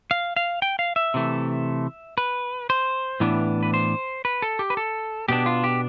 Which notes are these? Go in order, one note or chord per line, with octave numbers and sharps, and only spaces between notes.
F5
F5
G5
F5
E5
C3 E3 A3
B4
C5
A2 E3 B3 D4
B4
C5
B4
A4
G4
B4
A4
B2 B3 D4 G4
F4
G4